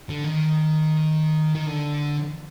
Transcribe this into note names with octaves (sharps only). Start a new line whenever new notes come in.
D3
D#3
D#3
D3